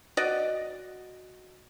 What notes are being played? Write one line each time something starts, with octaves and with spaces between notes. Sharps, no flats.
F#4 D5 D#5